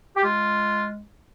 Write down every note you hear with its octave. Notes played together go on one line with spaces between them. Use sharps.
G4
G#3 F4